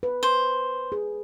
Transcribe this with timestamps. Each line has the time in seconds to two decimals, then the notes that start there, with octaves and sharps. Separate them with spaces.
0.03 B4
0.23 C5
0.92 G#4